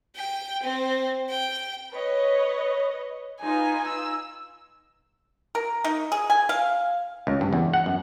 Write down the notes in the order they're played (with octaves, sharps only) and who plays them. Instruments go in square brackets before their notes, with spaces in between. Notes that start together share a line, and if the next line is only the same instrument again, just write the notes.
[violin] G5
C4
G5
[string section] B4 C#5 D#5
[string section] D#4 F4 B4 [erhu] G#5
[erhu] E6
[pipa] A#4
D#4
G#4
G#5
F5
[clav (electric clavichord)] C#2
G2
E2
F#5
F#2